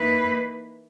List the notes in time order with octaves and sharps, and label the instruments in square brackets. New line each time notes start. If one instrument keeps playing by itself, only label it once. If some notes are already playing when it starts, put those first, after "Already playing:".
Already playing: [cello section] E3 A#3 D#4 B4